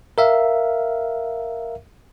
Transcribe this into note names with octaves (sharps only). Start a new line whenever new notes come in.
A#4 E5 F5